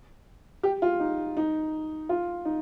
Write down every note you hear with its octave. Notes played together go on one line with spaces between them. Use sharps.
G4
F4
D#4
D#4
F4
D#4